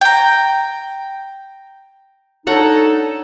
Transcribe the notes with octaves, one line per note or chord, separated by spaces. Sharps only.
G5 A#5
D4 D#4 A4 C#5 F#5 A#5